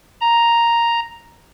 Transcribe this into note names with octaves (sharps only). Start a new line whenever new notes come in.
A#5